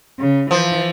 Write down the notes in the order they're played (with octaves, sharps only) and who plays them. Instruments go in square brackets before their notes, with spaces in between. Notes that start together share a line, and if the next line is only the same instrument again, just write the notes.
[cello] C#3
[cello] E3 [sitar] F3